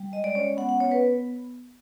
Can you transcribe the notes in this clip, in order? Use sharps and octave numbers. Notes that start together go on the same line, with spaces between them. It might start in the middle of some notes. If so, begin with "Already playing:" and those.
Already playing: G3
G#3 D#5
D5
C#4 C#5
B3 F#5
F#5
B3 C#5
B4